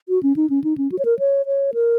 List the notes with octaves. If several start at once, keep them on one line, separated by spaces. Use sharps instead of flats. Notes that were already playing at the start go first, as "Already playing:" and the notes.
F#4
C#4
D#4
C#4
D#4
C#4
F#4
C#5
A#4
C#5
C#5
A#4